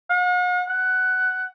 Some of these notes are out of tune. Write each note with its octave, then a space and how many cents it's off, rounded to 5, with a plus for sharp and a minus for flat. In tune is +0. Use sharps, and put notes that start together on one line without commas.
F#5 -45
F#5 +10